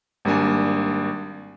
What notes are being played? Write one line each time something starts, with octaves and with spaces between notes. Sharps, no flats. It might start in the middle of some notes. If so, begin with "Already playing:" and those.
G#1 G3 A#3 D4 G#5